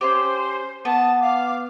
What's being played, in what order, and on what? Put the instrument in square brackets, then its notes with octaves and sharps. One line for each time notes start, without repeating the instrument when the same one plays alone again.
[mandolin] C#4 D#4 G4 [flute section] C5
[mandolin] B3 [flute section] A5
[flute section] F5 D6